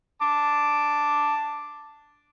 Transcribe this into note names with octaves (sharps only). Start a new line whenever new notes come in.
A5 D6